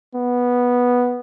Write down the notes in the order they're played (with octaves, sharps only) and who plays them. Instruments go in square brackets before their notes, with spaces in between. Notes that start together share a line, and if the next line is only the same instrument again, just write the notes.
[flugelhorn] B3